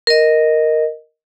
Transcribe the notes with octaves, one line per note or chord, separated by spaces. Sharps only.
A#4 D#5